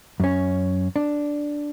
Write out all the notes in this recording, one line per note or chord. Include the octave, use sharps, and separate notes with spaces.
F#2 C#4
D4